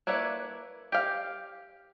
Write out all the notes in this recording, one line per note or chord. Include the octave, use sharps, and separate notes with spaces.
A#3 D4 E4 B4 C#5
G4 F5